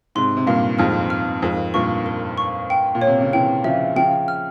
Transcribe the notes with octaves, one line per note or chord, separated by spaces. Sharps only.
G#2 C3 C6
C3
G2 A#2 F5
F2 G#2 F6
F6
F2 G#2 A#4
G2 A#2 C#6
A#4
C#6
G5
A#2
C#5
C3
C#3
C3 E3 G5
C#3 F3 E5
C#3 F3 G5
F6